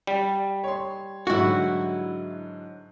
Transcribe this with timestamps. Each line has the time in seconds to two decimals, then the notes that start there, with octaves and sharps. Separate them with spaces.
0.07 G3
0.64 C#5 C6
1.27 G#2 D3 F#3 E4 F#4